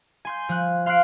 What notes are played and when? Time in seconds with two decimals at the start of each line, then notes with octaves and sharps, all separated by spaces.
0.25 G#5 C6 G6
0.49 F3 F#6
0.86 F5 C6 F6 F#6 C7 D7